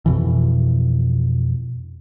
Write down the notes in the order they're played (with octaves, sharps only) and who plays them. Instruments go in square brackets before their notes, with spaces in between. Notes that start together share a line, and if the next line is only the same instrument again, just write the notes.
[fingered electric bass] F2 B2 E3